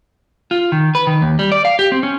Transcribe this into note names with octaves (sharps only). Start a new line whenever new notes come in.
F4
D#3
B4
D#3
D#2
G3
D5
F5
G4
C4
C#4